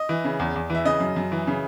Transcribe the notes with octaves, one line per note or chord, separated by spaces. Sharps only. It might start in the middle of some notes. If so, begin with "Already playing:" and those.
Already playing: D#5
E3
C#3
E2
E2
E3 E5
C#3 D#5
F#2
F#2
E3
C#3